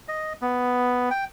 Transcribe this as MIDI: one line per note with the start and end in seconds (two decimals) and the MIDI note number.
0.08 0.33 75
0.42 1.09 59
1.10 1.25 79